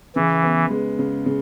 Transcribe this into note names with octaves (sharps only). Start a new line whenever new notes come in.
C#3 E3
B3
G#3
C#3
C#3